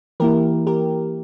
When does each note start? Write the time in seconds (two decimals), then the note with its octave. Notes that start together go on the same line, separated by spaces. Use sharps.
0.20 E3 A#3 E4 G4 A#4
0.67 G4 A#4